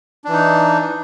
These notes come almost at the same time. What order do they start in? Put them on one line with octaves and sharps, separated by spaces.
D4 E3 D#4